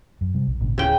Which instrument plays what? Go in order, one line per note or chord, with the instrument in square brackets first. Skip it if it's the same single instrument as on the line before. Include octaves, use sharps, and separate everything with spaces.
[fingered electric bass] F#2
C3 G3
B1
G#1 A#2 C#3
[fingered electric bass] D1 [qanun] C#3 G5